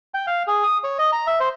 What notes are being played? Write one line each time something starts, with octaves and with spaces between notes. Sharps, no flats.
G5
F5
G#4
D#6
C#5
D#5
A#5
E5
C5